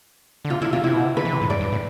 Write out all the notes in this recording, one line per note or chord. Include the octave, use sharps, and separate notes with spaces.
D3
C3 F4
D3 E4
C3 F4
C3 E4
B2
C3
D3 B4
E3
C3
A2
G2 D5
G2
A2